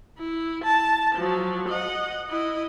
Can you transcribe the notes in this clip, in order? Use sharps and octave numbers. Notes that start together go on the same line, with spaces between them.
E4
A5
F3 F#3
D#5 F#5
E4 D#5